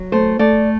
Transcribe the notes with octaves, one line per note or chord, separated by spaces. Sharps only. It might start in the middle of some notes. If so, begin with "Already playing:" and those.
Already playing: F#3
A3 C5
A3 D5